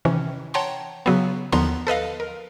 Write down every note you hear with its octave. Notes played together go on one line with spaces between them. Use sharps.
C3 D#3 E3 C#4
C#5 F#5 G5 A5 A#5 C6
C#3 F#3 B3
D#2 D3 F3 B3 A#5 C6
A4 B4 D#5 F5
A#4